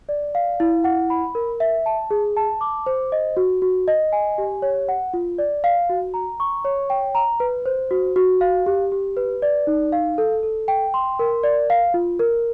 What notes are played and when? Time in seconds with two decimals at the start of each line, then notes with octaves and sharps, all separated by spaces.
0.09 D5
0.35 F5
0.60 E4
0.84 F#5
1.10 B5
1.35 A#4
1.60 E5
1.86 A5
2.11 G#4
2.37 A5
2.61 D6
2.86 C5
3.12 D#5
3.37 F#4
3.62 F#4
3.88 D#5
4.12 G#5
4.38 G4
4.62 C#5
4.89 F#5
5.14 F4
5.38 D5
5.64 F5
5.89 F#4
6.14 A#5
6.40 C#6
6.65 C#5
6.90 G5
7.15 A#5
7.40 B4
7.66 C5
7.91 F#4
8.16 F#4
8.41 F5
8.66 G4
8.92 G4
9.17 B4
9.42 D5
9.67 D#4
9.92 F5
10.18 A4
10.43 A4
10.68 G5
10.94 C6
11.19 A#4
11.44 D5
11.70 F5
11.94 F4
12.19 A#4